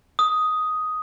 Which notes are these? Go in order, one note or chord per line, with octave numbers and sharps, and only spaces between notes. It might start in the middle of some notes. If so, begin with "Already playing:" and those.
D#6